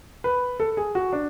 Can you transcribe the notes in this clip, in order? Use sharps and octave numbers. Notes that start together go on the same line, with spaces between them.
B4
A4
G#4
F#4
D4